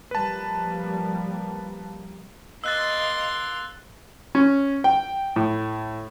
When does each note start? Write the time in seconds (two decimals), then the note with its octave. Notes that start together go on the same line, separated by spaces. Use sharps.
0.11 F3 G3 A#3 B4 A5
2.64 A#3 D#5 C6 E6 F#6 A6
4.35 C#4
4.84 G5
5.36 A2